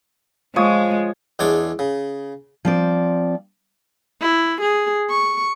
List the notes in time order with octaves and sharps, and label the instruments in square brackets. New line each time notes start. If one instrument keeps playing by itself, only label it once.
[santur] F3 C#5 D#6 [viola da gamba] G#3
[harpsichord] E2 G#3 D4 C#5 D6
C#3
[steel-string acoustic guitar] F3 C4 D5
[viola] E4
G#4
C#6